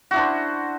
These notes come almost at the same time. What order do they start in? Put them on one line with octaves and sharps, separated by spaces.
F#4 E4 D4 C5